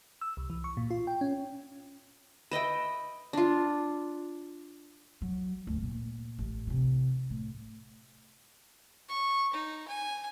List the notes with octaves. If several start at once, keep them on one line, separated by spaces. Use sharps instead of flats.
E6
C2
E3
C#6
A#2
F4
G5
C#4
B4 D#5 E5 G5
D4 F4
F#3
D2
A#2
A1
C3 E3
A2
C#6
D#4
G#5